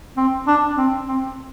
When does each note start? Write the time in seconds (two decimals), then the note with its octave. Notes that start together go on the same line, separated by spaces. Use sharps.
0.17 C4
0.47 D4
0.77 C4
1.08 C4